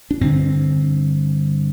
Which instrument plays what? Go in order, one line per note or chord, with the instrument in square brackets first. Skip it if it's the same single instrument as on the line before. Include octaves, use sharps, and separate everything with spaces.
[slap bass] D4
G2 D3 C4